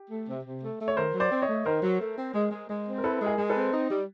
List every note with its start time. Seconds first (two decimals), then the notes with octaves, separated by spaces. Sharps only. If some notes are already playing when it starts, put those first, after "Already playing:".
Already playing: G4
0.11 A3
0.28 C3
0.45 C3
0.62 A3
0.80 A3
0.88 C#5
0.96 D#3 A#4 C5
1.15 F#3
1.20 C5 D5
1.31 C4
1.42 C#5 D#5
1.49 A3
1.66 D#3 A#4 C5
1.83 F#3
2.00 A3
2.18 C4
2.34 G#3
2.51 G#3
2.70 G#3
2.87 C4
2.98 A#4
3.04 E4 A4 B4
3.20 G#3
3.26 G#4 A#4
3.38 G#3
3.50 A4 B4
3.56 C4
3.73 D#4
3.90 G3